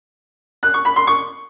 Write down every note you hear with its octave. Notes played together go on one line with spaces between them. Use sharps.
F#6
C#6
B5
C6
C#6